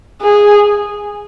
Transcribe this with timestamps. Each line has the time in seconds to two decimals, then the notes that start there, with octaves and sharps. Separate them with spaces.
0.22 G#4